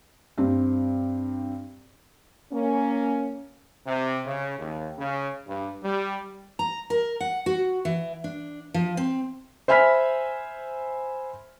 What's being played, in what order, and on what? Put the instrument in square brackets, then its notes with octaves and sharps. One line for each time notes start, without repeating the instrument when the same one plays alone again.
[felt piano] G2 C4
[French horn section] A#3 C#4
[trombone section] C3
C#3
D#2
C#3
G2
G3
[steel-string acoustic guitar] A#5
A#4
F#5
F#4
E3
D4
F3
C4
[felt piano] C5 E5 G#5 B5 F6 B6